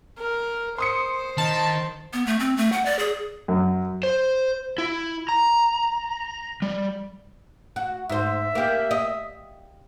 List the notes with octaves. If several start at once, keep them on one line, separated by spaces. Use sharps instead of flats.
A#4
C5 C6 D#6 C#7
D#3 A5
B3
A3
C4
A3
F#5
D5
G#4
F#2
C5
E4
A#5
G3
F#4
G#2 C5 E5
A#3 G4
D#5